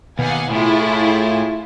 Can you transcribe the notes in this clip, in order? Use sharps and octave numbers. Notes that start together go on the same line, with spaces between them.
D#2 B2 F5 F#5 G#5
A2 E4 F4 G#4
A4